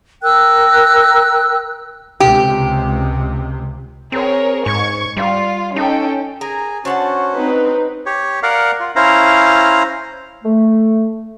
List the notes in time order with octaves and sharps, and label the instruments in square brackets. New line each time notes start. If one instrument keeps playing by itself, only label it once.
[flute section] A#4 G5 E6 F#6
[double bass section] C#2 C3 [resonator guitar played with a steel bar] G4
[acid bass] C4 [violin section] G#4 A#4 C#5
[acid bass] G#2 [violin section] C#6 G#6
[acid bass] G3 [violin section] F4
[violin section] C#4 A4 G5 [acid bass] D#4
[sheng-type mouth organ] G#4 G#5 A#5 [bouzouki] A#4
[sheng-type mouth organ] C#4 F#4 C5 [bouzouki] D4 F#5 A5
[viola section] C4 D#4 B4
[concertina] G4 C#5
A#4 D5 F5 F#5
F4
C#4 E4 C5 F5 A#5
[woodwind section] A3